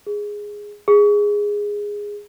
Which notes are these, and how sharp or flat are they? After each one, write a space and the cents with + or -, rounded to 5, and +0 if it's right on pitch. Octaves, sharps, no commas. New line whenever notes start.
G#4 -5
G#4 -10